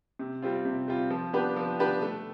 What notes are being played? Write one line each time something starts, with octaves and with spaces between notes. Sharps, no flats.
C3
G3 C4 F4
C3
G3 C4 F4
F3
B3 D4 G4 B4
F3
B3 D4 G4 B4
A3